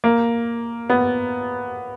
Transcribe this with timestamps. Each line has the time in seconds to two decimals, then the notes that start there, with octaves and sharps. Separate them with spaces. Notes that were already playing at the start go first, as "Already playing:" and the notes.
0.04 A#3
0.90 B3